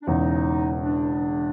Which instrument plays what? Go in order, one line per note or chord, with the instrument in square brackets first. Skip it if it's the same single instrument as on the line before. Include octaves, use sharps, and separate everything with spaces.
[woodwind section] D4
[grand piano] E1 E2 C#3 [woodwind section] D#4
[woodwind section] D4